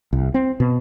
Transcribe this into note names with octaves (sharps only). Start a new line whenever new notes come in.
C2
C4
B2